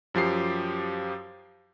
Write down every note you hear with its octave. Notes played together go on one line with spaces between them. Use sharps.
F#2 F3 G4 C7